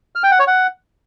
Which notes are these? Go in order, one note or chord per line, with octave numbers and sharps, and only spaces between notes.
F6
G5
F#5
C#5
F#5